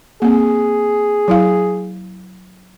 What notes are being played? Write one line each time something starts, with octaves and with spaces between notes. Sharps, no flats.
A#3 C4 G#4
F#3 E4 F5